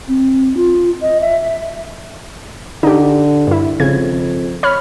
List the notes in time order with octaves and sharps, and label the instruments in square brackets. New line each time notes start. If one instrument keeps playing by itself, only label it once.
[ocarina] C4
F4
D#5
E5
E5
[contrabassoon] D3 [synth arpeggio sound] D#4 G4
[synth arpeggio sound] G2 E4
[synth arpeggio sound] G#1 C#3 G#6 [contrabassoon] F2
[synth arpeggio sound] C#5 B5 F6